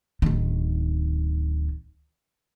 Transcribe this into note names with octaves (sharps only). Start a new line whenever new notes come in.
D1 D#3